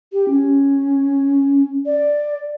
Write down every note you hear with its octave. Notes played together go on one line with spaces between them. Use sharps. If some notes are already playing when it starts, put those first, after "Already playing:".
G4
C#4
D5